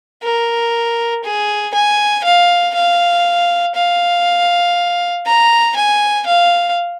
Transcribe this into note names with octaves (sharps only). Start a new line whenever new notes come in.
A#4
G#4
G#5
F5
F5
F5
A#5
G#5
F5